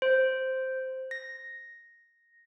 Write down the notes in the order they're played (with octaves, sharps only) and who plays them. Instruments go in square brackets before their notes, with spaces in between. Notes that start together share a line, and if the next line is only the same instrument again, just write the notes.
[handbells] C5
A#6